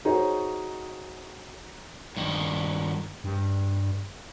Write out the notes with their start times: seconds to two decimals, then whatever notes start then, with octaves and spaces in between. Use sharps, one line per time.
0.05 D#4 F#4 G#4 C5 C#5 D#5
2.16 G2 D#3
3.24 G2